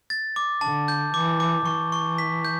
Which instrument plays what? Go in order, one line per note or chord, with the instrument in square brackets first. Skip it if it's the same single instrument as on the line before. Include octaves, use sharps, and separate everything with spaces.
[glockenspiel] A6
D6
[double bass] D3 [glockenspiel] A5
[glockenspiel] G6
[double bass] E3 [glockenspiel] D6
[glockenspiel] D6
[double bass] E3 [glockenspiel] C#6
[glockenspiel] C#6
B6
G6